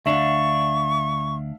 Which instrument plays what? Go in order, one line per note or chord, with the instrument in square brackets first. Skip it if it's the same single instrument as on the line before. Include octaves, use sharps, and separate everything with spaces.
[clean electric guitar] D2 D4 [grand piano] E5 F5 [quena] C#6